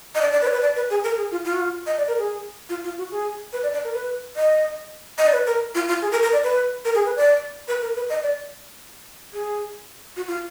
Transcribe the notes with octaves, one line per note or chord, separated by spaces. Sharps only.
D#5
D5
D5
B4
D5
B4
D5
B4
G#4
A#4
G#4
F4
F4
F#4
F4
D#5
D5
A#4
G#4
F4
F4
F#4
G#4
B4
D5
D5
A#4
B4
D#5
D#5
D5
B4
A#4
F4
F4
G#4
A#4
A#4
D5
B4
A#4
G#4
B4
D5
B4
A#4
B4
D#5
D5
G#4
F#4
F4